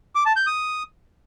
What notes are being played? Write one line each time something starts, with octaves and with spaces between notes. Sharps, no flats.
D6
A5
G6
D#6